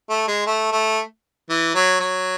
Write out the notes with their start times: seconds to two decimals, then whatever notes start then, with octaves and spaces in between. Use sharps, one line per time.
0.10 A3
0.28 G#3
0.47 A3
0.72 A3
1.50 E3
1.75 F#3
2.00 F#3